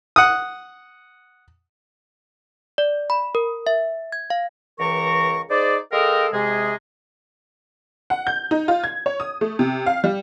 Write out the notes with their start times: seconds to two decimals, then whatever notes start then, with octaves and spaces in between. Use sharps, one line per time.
0.16 F#5 D#6
2.78 D5
3.10 B5
3.35 A#4
3.67 E5
4.12 G#6
4.30 F5
4.79 C#2 E3 A#4 A#5 C#6
5.50 D#4 G#4 C5 D5
5.93 G#3 A4 A#4 D#5 F5 G5
6.33 C3 G#3 G#4
8.10 F#5
8.27 G6
8.51 D#4
8.68 F4
8.84 G#6
9.06 C#5
9.20 D#6
9.41 A3
9.59 C3
9.86 F5
10.04 G3